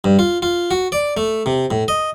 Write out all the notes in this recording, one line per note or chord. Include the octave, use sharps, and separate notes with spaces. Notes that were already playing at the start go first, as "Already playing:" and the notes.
G2
F4
F4
F#4
D5
A3
C3
A2
D#5